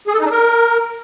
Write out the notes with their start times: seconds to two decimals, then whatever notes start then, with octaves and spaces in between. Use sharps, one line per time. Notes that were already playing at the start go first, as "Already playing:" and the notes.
0.07 G#4
0.13 A4
0.19 D#4
0.25 D4
0.31 A#4